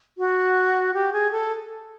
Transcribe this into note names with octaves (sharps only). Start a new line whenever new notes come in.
F#4
G4
G#4
A4